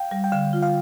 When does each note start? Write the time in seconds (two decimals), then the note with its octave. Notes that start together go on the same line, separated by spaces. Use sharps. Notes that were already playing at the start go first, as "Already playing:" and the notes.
Already playing: F5 G5
0.11 G3
0.24 G5
0.32 D3 F5
0.53 F4
0.62 F5